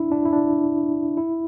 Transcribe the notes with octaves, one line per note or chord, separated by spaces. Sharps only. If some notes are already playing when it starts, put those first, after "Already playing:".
Already playing: D4 E4
D4
E4
D4
E4